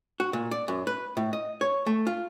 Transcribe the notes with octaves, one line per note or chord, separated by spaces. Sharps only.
F#4
A#2
D5
F#2
B4
A2
D#5
C#5
A3
F4